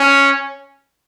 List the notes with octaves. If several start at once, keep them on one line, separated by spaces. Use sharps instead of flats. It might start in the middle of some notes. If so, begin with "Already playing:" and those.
Already playing: C#4